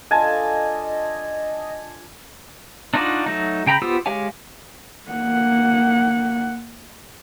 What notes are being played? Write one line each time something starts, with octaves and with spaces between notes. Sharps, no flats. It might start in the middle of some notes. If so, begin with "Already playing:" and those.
D4 F4 A4 D#5 G#5 A5
D4 D#4 F4 F#4 D5
F#3 A3 D#4
C#3 G5 A#5 B5 G6
B3 F4 G4 C5 E6
G#3 G4 C#5 F5 G#5
A#3 F#5